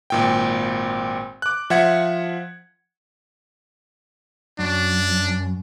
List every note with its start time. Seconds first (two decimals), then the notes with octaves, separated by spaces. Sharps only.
0.10 G#1 A#2 G5
1.42 D6 F#6
1.70 F3 E5 F#5 G#6 C#7
4.59 F#2 D4